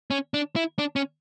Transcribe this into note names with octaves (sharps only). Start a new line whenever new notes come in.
C#4
D4
E4
D4
C#4